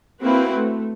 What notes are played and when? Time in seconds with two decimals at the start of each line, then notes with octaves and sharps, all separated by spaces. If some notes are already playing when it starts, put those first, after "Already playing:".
0.22 A#3 C4 E4 F#4 B4
0.55 A3